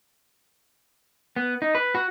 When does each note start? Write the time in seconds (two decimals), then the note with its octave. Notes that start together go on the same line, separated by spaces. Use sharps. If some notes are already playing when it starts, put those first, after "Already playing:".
1.36 B3
1.62 D#4
1.75 B4
1.95 F#4